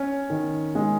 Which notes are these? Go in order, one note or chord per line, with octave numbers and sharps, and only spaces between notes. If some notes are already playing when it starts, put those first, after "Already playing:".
Already playing: C#4
D#3
G#3